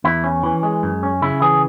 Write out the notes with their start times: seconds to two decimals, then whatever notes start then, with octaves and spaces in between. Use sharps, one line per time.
0.04 E2 E4
0.24 C#4
0.43 E3
0.63 G#3
0.83 F#2
1.03 C#4
1.22 C#3 E4
1.41 E3 G#4